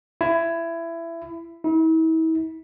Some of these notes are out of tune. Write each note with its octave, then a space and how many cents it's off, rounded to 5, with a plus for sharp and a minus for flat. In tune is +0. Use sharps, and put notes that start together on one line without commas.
E4 +20
E4 -40